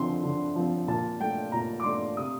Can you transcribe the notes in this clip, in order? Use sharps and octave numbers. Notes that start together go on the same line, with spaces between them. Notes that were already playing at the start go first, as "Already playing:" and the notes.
Already playing: D3 F3 C4 C6
D3
F3 C4
A#2 A5
A3 D4 G5
A#2 A#5
D6
A3 D4 C6
C3 D#6